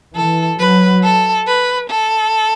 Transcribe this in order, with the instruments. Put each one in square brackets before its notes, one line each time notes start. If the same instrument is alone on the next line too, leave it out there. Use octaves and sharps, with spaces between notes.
[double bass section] E3 [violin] A4
[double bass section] F#3 [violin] B4
[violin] A4
B4
A4